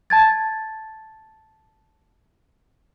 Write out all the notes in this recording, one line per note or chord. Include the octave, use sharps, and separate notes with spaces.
A5 G#6 A6